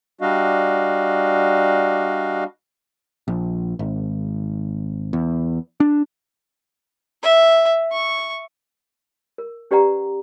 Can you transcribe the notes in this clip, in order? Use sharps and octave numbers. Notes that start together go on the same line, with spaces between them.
G3 D4 F#4 D#5 F5
A#1
G#1
E2
D4
E5
C#6
A#4
C#4 G4 B4 D5 F#5 A#5